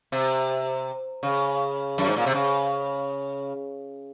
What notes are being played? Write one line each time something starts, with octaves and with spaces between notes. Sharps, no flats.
C3
C#3
F#2
G#2
A#2
C3
C#3